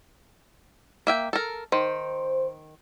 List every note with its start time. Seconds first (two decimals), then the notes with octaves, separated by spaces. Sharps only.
1.07 A#3 E5 G5
1.33 A4 A#4
1.72 D#3 C5